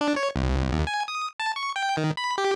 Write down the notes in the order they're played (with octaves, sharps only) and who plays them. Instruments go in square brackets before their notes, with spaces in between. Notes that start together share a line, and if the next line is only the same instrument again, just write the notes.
[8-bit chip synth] D4
C#5
C2
D#2
G#5
D#6
A5
C#6
G5
D#3
B5
G4